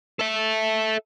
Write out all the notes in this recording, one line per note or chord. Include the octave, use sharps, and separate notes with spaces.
A4 E5